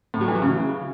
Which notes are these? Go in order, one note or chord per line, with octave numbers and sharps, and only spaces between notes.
A2
F#3
E3
F#3
C#3